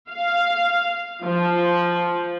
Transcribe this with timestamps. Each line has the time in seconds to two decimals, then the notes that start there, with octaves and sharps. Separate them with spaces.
0.10 F5
1.24 F3